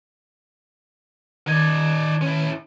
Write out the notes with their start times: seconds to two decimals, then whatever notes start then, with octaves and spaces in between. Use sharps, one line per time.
1.47 D#3 D#4 D5 G#6
2.22 C#4 E4